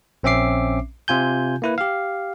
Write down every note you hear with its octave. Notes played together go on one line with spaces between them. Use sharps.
A#1 C4 C#4 E5 D6 C7
C3 F4 G#5 G6
A#3 E4 B4
G4 F5